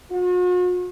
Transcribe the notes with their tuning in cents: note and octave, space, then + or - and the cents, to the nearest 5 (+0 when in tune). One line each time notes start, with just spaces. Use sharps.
F#4 -45